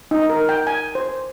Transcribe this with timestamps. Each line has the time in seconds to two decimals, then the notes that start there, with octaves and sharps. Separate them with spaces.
0.11 D#4
0.30 A#4
0.49 G5
0.67 G#5
0.95 C5